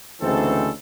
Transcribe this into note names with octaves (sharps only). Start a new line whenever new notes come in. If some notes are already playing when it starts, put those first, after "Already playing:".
D2 G#2 C#3 E3 C4 A4